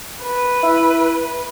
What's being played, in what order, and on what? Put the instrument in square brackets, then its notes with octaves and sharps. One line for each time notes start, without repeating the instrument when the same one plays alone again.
[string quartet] B4
[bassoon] E4